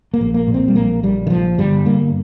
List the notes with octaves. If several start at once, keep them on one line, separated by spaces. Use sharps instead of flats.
A#3
A#1
A#3
A#2
C4
G3
A#1 A#3
A#1 G3
D#3
A#1 F3
G1 G3
G2 A#3